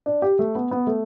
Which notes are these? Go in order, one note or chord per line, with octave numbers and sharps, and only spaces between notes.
D4
G4
A3
B3
B3
A3